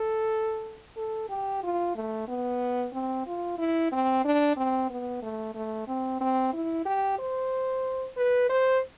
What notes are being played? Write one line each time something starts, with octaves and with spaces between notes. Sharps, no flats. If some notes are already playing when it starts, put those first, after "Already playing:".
Already playing: A4
A4
G4
F4
A3
B3
C4
F4
E4
C4
D4
C4
B3
A3
A3
C4
C4
E4
G4
C5
B4
C5